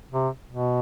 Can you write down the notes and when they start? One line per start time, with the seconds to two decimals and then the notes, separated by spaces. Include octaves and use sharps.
0.11 C3
0.50 B2